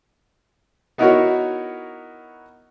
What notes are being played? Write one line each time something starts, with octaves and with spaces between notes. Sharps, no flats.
B3 D#4 E4 F#4 A#4 C#5